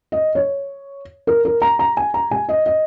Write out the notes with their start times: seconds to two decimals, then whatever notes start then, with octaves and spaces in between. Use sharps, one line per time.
0.12 D#5
0.35 C#5
1.27 A#4
1.45 A#4
1.62 A#5
1.79 A#5
1.97 G#5
2.14 A#5
2.31 G#5
2.49 D#5
2.66 D#5